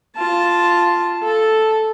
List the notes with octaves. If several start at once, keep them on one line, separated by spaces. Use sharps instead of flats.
F4 A5
A4